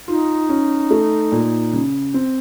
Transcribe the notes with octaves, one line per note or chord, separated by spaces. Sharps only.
D#4 F4
C#4
A3
A#2
C#3
C4